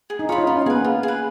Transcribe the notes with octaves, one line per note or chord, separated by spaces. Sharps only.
G#4
D#4
F4 C#5 F5 B5
D#4
C#4 F4
D#4
B3 G#4 B4
A#3
F4
G#4 B4